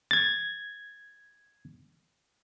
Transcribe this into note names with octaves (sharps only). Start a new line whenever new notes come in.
G#6 A6